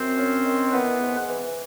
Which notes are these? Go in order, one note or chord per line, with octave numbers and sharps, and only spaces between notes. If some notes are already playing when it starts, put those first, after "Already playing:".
Already playing: F#2 C4 C5
C#4
D#3
E3 B3 B4
G#2
E3